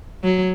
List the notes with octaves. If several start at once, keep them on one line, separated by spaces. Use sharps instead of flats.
F#3